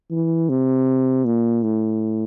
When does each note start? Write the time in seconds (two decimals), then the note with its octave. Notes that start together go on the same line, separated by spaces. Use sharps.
0.11 E3
0.50 C3
1.25 A#2
1.63 A2